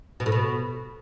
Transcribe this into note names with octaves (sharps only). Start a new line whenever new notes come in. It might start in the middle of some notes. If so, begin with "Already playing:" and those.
B2
A2
B2